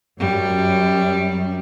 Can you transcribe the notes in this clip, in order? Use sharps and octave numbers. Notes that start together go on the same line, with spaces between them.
F#2 G3